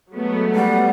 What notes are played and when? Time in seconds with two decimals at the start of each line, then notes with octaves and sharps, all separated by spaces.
0.14 F#3 G#3 A3 B3
0.55 G3 F#5